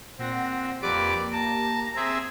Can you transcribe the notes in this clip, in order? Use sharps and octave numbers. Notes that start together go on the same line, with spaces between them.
A#2 C4 F#5 A#6
F2 A#3 G4 B4 D5 D6
A5 A#5
C4 G#4 E5